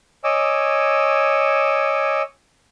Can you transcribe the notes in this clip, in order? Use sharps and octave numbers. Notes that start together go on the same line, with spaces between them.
C#5 D#5 G#5 D6 E6